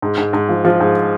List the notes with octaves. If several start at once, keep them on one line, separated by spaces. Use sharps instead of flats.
G#2
G#2
G#2
F3
F3
G#2